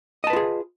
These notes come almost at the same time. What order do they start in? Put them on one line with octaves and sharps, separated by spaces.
D#5 A5 B4 F4 G#4